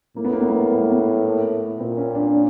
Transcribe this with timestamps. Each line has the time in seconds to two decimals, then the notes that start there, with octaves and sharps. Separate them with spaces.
0.16 A2 A#3
0.24 B3
0.33 A#3
0.41 B3
0.48 A#3
0.70 B3
0.81 A#3
0.92 B3
1.79 A#2 C4
1.97 C#4
2.15 D4
2.33 D4